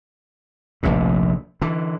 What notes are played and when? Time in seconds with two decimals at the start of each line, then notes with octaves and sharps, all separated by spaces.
0.83 F1 A#1 D#2 A2
1.62 D3 E3